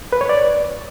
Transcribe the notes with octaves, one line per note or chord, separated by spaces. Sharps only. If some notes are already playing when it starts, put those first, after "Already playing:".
B4
C#5
D5